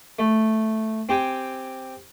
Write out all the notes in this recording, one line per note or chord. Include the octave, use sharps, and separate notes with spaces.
A3
C4 G4 G#5